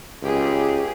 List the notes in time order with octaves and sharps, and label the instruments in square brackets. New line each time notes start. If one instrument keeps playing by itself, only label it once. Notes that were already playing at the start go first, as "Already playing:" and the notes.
[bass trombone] C#2 [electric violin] G4 G#4